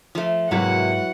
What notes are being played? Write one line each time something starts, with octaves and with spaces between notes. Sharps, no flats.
F3 A3
G#2 C3 F#3 A#3 E4 F#4 B4 F#5